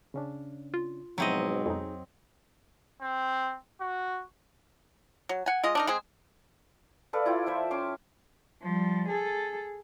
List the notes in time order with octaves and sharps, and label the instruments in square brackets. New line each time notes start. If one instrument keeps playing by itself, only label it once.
[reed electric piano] C#3 C#4 D4
[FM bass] F4
[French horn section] G#2 B2 [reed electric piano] F3 E4 [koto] F#3 C4 D#5
[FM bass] F2 [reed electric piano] D#4 G#4
[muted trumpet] C4
F#4
[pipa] F#3
F#5 G#5
G#3 F4 D#5
D4 D#4 A#4
G#3 C4 G#4
[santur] A4 B4 D5 F5
E4 F4 G5
F3 C5 E5
C#4 C6 D6
[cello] F3 G3
G#4 A4